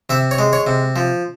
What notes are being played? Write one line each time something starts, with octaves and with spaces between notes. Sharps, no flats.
C3 E5
C#5
G#3
C#5
C3
F3